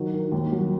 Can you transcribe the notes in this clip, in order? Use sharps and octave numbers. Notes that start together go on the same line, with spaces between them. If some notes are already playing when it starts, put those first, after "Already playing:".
Already playing: D#3 F#3
D#3
D#2
F#3